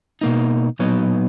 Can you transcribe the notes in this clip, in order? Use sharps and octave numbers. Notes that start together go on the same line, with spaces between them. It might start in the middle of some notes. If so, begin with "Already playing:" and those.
B2 A#3 D#4
A#2 F#3 B3 D#4